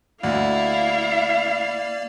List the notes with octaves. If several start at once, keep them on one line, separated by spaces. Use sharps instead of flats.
D2 A#3 E4 D5 F5